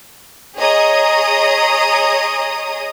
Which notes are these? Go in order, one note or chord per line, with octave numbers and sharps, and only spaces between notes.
G#4 C#5 D#5 A#5 D#6